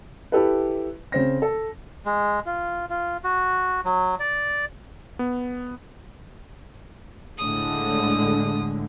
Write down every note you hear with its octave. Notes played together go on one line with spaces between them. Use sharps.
E4 G4 A4 B4
C#3 C4 A#6
A4
G#3
F4
F4
F#4
F#3
D5
B3
A2 D3 G#3 D#6